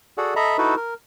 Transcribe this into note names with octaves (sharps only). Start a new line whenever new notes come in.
F#4 G#4 A4 D5 F#5
A4 D#5 E5 A#5 B5
D#4 E4 F#4 A4 B4
A#4